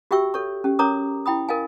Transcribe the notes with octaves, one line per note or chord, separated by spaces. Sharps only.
F#4 G4 E5 G5 C#6 E6
A4 C#5 C#6
C#4 G4
C#4 A#4 C#5 A#5 D6 D#6
E4 G5 B5 D#6
A#4 D#5 F5 G#5